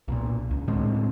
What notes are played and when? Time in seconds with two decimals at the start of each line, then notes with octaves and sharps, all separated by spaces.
0.08 B1 A#2
0.51 C#2
0.67 A2 D3 G#3 C4